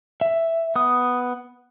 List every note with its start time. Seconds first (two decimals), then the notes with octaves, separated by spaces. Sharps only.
0.21 E5
0.76 B3 D#6